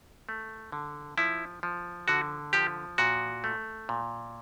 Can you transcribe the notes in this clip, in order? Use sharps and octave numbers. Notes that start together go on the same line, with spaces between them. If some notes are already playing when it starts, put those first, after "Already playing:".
A3
D3
F3 E4
F3
D3 F#4
F3 G4
A#2 F#4
A3
A#2